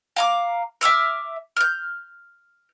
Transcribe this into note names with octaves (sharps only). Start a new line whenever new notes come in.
F5 A#5 D6
E5 D6 E6 F6
F6 G6